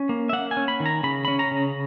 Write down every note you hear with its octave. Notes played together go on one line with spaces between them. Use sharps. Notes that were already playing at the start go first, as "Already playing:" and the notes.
Already playing: C#4
A#3
E5
A#3 F#5
G#5
C#4
B5
D#3
A#5
C#3 B5
C#4 B5
A#5
C#3